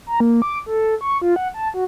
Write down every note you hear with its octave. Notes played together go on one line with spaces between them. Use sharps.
A#5
A#3
D6
A4
C#6
F4
F#5
A5
F#4